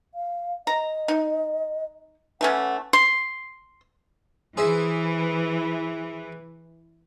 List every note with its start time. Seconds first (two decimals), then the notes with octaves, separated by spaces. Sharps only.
0.15 F5
0.67 D#5 A#5
1.08 D#4
2.41 E3 A3 C#4 F#5
2.93 C6
4.57 E3 G#4 C5 E5